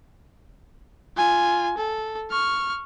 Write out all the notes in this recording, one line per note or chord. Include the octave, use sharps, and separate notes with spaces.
F4 G#5
A4
C#6 F6